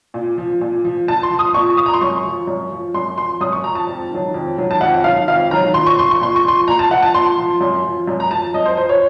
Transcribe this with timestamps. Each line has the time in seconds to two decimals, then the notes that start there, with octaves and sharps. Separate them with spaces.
0.14 A#2
0.38 F3
0.61 A#2
0.85 F3
1.08 A#2 A5
1.23 C6
1.31 F3
1.39 D#6
1.54 A#2 C#6
1.77 F3 D#6
1.86 A#5
1.93 C6
2.01 F#2 C#6
2.25 F3
2.47 F#2
2.72 F3
2.94 F#2 C6
3.18 F3 C6
3.41 F#2 D#6
3.52 C#6
3.64 F3 A#5
3.75 A5
3.87 F2
4.11 D#3 F#3
4.34 F2
4.57 D#3 F#3
4.71 A5
4.81 F2 F#5
5.04 D#3 F#3 F5
5.28 F2 F5
5.51 D#3 F#3 A#5
5.74 A#2 C6
5.87 C#6
5.97 F3 C6
6.11 C#6
6.21 A#2 C6
6.36 C#6
6.44 F3 C6
6.68 A#2 A#5
6.79 A5
6.90 F3 F#5
7.02 A5
7.14 A#2 C6
7.38 F3
7.61 F#2
7.84 F3
8.07 F#2
8.20 A#5
8.31 F3 A5
8.54 F#2 D#5
8.66 C5
8.77 F3 C5
8.89 C#5